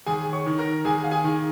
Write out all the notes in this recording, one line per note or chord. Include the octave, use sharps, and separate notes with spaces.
D#2 G#4 G#5
C#5 C#6
D#3
A#4 A#5
D#2 G#4 G#5
F5
G#4 G#5
D#3